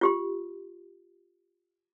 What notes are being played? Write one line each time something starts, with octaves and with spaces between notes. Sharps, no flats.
F4 G4 C6